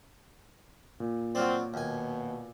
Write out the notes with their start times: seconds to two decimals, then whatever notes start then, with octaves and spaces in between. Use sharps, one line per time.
1.00 A#2
1.35 F#3 C4 F4 D5
1.74 D#2 B2 G#5